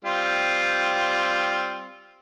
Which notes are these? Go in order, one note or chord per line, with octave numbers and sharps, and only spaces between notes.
G3 C4 F4